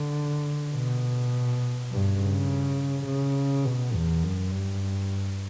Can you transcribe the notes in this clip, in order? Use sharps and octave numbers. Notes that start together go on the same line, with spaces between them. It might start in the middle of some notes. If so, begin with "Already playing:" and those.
Already playing: D3
B2
G2
C#3
C#3
B2
E2
F#2
G2